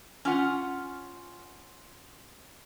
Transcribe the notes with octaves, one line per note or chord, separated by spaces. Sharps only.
C#4 F4 F#5